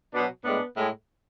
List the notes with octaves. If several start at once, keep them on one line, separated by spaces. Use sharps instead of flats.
B2 F#3 B3 D4
A2 G#3 B3 D4
A2 G#3